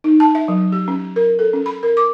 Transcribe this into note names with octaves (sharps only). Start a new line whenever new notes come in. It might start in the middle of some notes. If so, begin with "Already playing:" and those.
D#4
A5
E5
F#3
G4
C#4
A#4
A4
C#4
B5
A#4
D6